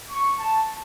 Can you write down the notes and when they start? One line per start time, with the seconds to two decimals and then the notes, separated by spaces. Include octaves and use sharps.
0.11 C#6
0.39 A5